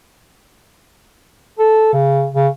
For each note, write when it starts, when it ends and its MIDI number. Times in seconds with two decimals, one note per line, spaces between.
1.59 1.91 69
1.93 2.27 49
2.34 2.48 49